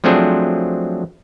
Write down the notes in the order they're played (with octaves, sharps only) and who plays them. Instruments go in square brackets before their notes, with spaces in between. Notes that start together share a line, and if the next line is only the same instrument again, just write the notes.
[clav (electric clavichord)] F3 F#3 A3 C4 D4 G#4